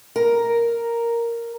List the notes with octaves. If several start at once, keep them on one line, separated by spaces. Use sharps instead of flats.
A#4